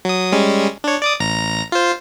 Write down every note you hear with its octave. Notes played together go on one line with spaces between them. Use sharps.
F#3 D#6
G3 G#3 C#4
D4 C#5
D5 D6 D#6
A1 A#5 A#6
F4 C5